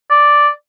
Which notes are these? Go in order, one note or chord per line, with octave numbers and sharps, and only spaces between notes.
D5